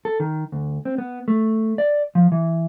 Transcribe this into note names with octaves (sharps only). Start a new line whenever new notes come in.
A4
D#3
D2
C4
B3
A3
D5
F3
E3